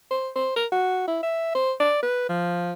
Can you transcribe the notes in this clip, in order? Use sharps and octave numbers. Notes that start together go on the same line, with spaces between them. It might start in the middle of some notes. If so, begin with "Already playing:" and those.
C5
C5
A#4
F#4
E4
E5
C5
D5
B4
F3